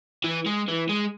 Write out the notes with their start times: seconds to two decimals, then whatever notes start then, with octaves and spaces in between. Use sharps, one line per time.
0.24 E3
0.46 G#3
0.68 E3
0.89 G#3